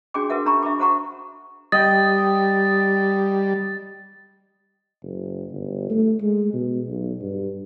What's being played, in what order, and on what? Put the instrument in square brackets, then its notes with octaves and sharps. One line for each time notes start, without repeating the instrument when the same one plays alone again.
[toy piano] D4 F#4 G#4 G5 D6
F#4 A#4 B4 E5 F#5
D4 A#5 B5 C#6
E5 B5 D6
F#4 C5 F#5 A#5 C#6
[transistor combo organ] G3 [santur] D#5 G5 [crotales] A6
[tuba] F#1
G1
A3
G#3
B2
B1
G2